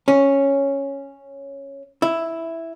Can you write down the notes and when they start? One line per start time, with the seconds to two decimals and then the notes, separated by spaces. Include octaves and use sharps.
0.08 C#4
2.02 E4